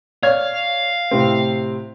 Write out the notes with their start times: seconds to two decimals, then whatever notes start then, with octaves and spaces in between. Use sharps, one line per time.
0.23 C#5 D5 F5 G#6
1.11 A2 C3 C4